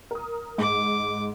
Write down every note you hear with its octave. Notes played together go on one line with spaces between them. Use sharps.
A#4 D#6
G#2 D6